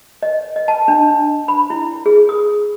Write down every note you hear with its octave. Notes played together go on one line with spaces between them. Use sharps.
D#5
D#5
A5
D4
B5
E4
G#4
D#6